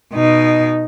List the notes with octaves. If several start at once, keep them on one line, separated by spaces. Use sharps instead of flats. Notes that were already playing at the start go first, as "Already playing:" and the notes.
B2 D#4